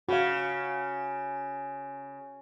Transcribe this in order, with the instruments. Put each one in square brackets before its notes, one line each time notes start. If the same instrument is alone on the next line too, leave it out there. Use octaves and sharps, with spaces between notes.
[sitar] C#3 [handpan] F#4 F5